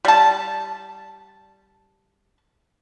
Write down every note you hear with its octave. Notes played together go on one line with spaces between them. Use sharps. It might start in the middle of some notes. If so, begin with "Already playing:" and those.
G3 A5